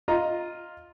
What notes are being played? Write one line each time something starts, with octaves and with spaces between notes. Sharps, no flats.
F4 D#5 A#5